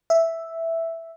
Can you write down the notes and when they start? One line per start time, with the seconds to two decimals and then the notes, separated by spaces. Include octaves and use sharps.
0.10 E5